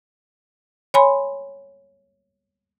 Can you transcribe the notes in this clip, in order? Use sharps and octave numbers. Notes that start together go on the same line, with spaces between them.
C#5 G#5 B5 C6